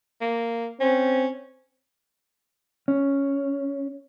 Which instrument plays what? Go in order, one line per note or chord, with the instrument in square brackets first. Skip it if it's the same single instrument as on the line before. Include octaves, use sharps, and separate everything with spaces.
[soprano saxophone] A#3
[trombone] C4 [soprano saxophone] C#4
[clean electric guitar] C#4